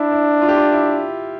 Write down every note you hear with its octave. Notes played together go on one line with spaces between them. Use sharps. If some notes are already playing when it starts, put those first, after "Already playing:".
Already playing: D4 E4
E4
F4
G4
F4
E4